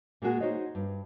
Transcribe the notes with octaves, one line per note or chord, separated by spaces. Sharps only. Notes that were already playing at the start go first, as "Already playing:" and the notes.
A#2 G#3 A#3 B3 F#4 G#4
D#4 F4 F#4 C5 C#5 D#5
G2